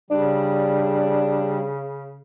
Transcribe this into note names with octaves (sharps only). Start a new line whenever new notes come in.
C#3 G3 D4